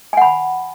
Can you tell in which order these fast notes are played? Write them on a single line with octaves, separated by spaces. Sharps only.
G#5 F#5 B5